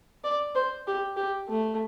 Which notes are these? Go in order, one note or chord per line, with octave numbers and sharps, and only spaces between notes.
D5
C5
G4
G4
A3